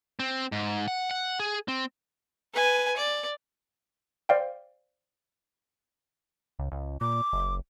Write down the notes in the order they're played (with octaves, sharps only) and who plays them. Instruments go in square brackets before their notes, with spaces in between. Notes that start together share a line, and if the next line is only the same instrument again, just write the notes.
[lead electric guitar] C4
G#2
F#5
F#5
G#4
C4
[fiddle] B4 G#5
D5
[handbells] C5 D5 F5 G5
[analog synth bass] C#2
C#2
[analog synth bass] A#2 [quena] D6
[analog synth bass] F#1